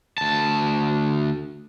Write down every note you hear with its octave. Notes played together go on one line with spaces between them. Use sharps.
D2 A5